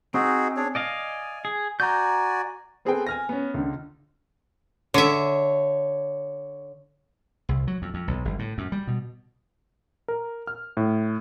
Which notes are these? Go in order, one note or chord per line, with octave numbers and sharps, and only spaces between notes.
C4 D#4 F#4 G#4
D4 G#4 C#5
D5 D#5 F5 G#5
G#4
F#4 D5 G#5 A#5 G6
B3 C4 G#4 A4 B4 G5
G#5 F6 A#6
B3 C#4
C#2 D3
D3 C#5 E5
C2
F#3
F2
F2
B1
G1
A2
F#2
G3
B2
A#4
F6
A2